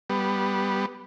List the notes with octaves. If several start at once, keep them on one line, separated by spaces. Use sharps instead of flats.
G3 B3